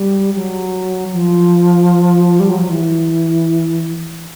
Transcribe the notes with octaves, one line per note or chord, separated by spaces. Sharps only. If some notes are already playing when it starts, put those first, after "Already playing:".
Already playing: G3
F#3
F3
G3
F#3
F3
E3